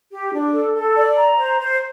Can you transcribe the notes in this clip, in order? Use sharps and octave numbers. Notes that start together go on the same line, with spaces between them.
G4
D4
A4
A4
D5
A#5
C5
C5